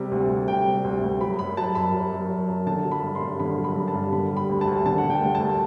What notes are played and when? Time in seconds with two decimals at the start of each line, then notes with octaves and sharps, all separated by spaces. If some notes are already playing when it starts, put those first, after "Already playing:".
Already playing: C3 G3
0.11 D2
0.29 D2
0.48 C3 G5
0.66 G3
0.84 D2
1.02 D2
1.21 F#3 B5
1.39 F#2 B5
1.57 F#3 A5
1.75 F#2 B5
1.94 F#3
2.12 F#2
2.30 F#3
2.48 F#2
2.67 D3 A5
2.85 F#3
2.91 B5
3.03 G2
3.15 C6
3.21 G2
3.40 D3 B5
3.58 F#3
3.64 B5
3.76 G2
3.88 A5
3.94 G2
4.12 D3 B5
4.31 G3
4.37 B5
4.49 D2
4.61 A5
4.68 D2
4.86 D3 A5
4.98 F#5
5.04 G3
5.10 G5
5.22 D2
5.35 A5
5.40 D2